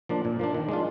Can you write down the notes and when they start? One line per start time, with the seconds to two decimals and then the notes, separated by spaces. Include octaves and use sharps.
0.09 F3 A#3 D4
0.25 A#2
0.39 F3 A#3 D4
0.54 D#3
0.69 G#3 D4 F4